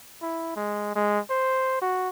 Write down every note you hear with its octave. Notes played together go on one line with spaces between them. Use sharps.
E4
G#3
G#3
C5
F#4